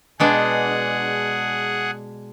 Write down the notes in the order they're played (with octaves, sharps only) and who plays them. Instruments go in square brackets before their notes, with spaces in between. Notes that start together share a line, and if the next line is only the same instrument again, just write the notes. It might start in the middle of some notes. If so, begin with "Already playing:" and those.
[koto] B2 G#3 D4 [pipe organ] G#4 F#5